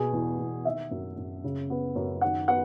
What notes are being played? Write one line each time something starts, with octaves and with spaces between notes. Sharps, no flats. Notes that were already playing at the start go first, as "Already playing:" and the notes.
Already playing: B2 G#4
E2
E2
D#3 E5
F#2
F#2
C#3
B3
F#2
D#3 F#5
B3 F#5